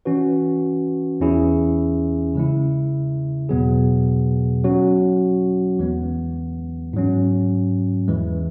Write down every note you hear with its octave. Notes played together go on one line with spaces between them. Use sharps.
E3 C#4 F#4 B4
E2 E3 C#4 E4 G#4
C#3 G#3 E4
E2 B2 F#3 B3 G#4
F#3 C#4 F#4
E2 E3 G#3 B3
G#2 F#3 C#4
E2 E3 G#3